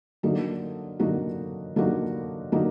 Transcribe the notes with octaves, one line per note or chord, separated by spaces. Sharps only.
D3 F#3 A#3 D#4 F#4
D3 F#3 A#3 D#4 F#4
D3 F#3 A#3 D#4 F#4
D3 F#3 A#3 D#4 F#4